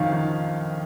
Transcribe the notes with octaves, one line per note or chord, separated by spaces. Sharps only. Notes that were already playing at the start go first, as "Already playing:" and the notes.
Already playing: A#1 F2 D#3 F#3 C#5 F5
D#3